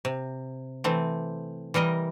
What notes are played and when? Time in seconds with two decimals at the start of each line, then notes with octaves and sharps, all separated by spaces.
0.05 C3
0.84 E3 A3 C4
1.74 E3 G3 A#4 D#5